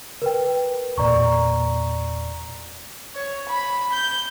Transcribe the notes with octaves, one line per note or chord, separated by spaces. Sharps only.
A#4 B4 G5
E1 A#2 D5 A#5 C#6
C#5
B5
G6